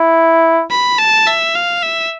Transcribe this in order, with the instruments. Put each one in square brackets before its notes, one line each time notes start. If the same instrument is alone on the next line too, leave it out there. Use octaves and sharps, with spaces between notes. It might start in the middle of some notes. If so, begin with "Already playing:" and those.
Already playing: [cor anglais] E4
[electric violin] B5
A5
E5
F5
E5